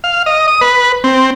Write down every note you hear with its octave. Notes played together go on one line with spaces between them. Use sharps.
F5
D#5
D#6
B4
C4